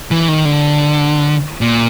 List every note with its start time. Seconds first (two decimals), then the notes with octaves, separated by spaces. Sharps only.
0.11 E3
0.28 D#3
0.45 D3
1.61 A#2